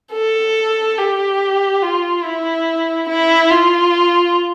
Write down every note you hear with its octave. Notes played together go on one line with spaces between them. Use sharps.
A4
G4
F4
E4
E4
F4